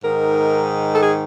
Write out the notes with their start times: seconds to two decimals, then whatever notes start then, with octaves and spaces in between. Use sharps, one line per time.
0.03 G#2 D#3 A#4
0.94 A4
1.02 G#4